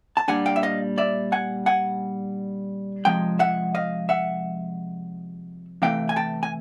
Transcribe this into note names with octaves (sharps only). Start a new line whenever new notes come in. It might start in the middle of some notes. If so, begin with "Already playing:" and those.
A5
A#2 G3 A#3 D4 F#5 G#5
F5 G5
E5
D#5 F5
D5 E5
F#5 G#5
F#5 G#5
C3 F3 G#3 G5
E5 F#5
D#5 F5
E5 F#5
C3 E3 A3 F5 G5
G#5
G5 A5
G#5